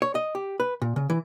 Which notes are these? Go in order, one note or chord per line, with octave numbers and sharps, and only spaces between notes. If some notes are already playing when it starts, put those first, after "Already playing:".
C#5
D#5
G4
B4
A#2
C#3
E3